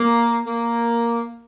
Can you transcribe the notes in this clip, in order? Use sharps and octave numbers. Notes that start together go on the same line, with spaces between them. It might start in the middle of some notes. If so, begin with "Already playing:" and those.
Already playing: A#3
A#3